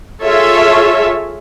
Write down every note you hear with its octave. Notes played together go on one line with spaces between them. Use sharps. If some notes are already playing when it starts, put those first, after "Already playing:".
F4 G#4 A4 C#5 E5